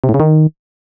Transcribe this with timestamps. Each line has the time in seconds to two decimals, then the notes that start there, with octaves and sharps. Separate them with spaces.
0.04 C3
0.09 A2
0.14 C#3
0.20 D#3